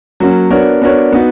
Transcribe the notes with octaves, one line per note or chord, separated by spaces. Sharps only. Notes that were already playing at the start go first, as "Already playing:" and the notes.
F#3 A#3 C#4 F#4
B3 D4 F#4 A#4 C#5
B3 D4 F#4 A#4 C#5
B3 D#4 F#4